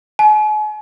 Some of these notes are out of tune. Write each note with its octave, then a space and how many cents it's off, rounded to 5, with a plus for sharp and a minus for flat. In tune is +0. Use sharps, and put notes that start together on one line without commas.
G#5 +40